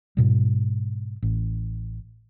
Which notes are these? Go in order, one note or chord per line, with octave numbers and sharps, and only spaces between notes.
G#2 B2 G3
A1